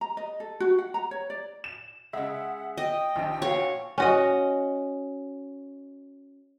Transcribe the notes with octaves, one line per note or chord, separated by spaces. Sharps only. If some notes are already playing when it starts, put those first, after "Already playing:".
A#5
D#5
A4
F#4
F#5
A#5
C#5
D5
E7
C#3 G#3 E5 F#5
D#5 G5
A#1 D#3 G3
F#4 C#5 F5
C#4 F#4 D#5